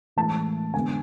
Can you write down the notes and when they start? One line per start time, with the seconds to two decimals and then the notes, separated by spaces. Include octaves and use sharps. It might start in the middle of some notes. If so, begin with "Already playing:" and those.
0.16 A2 E3 G#3 A5
0.74 D3 G#3 B3 G#5